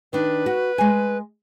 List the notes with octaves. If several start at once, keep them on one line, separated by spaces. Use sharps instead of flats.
D#3 D4 B4
F#4
G#3 G#5